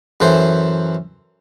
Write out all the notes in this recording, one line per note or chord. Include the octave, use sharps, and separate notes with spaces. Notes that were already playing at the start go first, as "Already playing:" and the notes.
F#2 E3 A4 C5